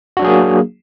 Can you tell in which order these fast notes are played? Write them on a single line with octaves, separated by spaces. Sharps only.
F#4 D4 F#3 G#4 A#3